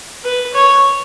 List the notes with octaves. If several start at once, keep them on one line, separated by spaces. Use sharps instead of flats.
B4
C#5